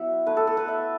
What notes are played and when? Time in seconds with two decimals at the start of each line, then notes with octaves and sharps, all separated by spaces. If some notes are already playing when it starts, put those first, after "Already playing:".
Already playing: F#3 B3 E4 E5 F#5
0.26 A3 E4 B4
0.37 A4
0.47 A4
0.57 B4
0.68 E5